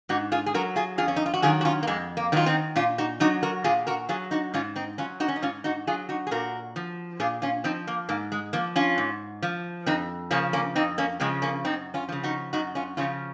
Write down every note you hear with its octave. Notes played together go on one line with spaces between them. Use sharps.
G#2 D#4 F#4
F4 G#4
G#4
F#3 F#4 A#4
F4 G#4
F2 F4 G#4
C#4
D#4
F4
F#4
D#3 F#3 F4 G#4
F#4
C#4 F4
A#3
F2 G#3
A#3
D#3 F#3 F4
C4 D#4
A#2 C#4 F4
D#4 F#4
F#3 D#4 F#4
F#4 A#4
A#2 F4 G#4
F#4 A#4
F#3 F4 G#4
D#4 F#4
G#2 C#4 F4
C4 D#4
F#3 C#4 F4
D#4 F#4
C#4
D#4
G#2 C#4 F4
D#4 F#4
F#3 F4 G#4
D#4 F#4
G#4
A#2 F#4 A#4
F3
A#2 F4 G#4
C#4 F4
F3 C4 D#4
A#3
G#2 A#3
G#3
F3 A#3
C#4 F4
G#2
F3
F2 C4 D#4
C#3 F3 A#3 C#4
A#3 C#4
F2 C4 D#4
A#3 C#4
C#3 F3 G#3 C4
A#3 C#4
F#2 C4 D#4
C#4 F4
C#3 F3
D#4 F#4
F#2 D#4 F#4
C#4 F4
C#3 F3 C#4 F4